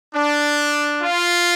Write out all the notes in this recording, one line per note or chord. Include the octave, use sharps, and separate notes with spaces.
D4
F4